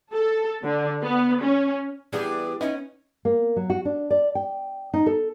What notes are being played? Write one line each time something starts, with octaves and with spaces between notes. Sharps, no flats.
A4
D3
B3
C#4
E3 G3 B3 D4 E4 G4 G#4
B3 C#4 D#4 E4
A#3
F#3
F#4
D4
D5
G5
D#4
A4